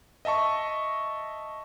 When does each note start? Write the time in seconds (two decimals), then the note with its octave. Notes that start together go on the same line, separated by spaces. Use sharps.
0.25 D#5 E5 A5 C#6